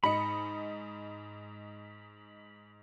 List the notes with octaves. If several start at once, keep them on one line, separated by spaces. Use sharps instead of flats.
G#2 D#5 B5 C#7